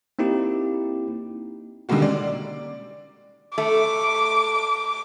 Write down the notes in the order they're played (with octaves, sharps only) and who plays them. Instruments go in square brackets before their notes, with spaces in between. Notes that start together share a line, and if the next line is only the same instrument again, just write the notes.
[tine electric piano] A#3 C4 D#4 E4 G4
[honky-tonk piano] D3 D#3 G3 G#3 A#3 F#4
D5
[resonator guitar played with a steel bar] A3 [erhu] D6